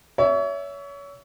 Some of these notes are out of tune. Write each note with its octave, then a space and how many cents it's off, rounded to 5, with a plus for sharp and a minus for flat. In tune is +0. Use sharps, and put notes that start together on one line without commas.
C#5 +30 E5 +0